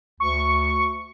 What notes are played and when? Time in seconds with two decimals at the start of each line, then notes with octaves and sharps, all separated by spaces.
0.20 D2 C#6